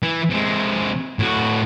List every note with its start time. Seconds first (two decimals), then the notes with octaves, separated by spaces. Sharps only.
0.03 E3
0.30 C3 G#3
1.19 A2 F#4